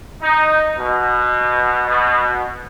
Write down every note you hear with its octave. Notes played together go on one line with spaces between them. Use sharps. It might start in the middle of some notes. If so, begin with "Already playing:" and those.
D#4
B2
B2